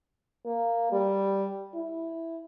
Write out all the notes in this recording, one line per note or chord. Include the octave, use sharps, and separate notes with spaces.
A#3
G3
E4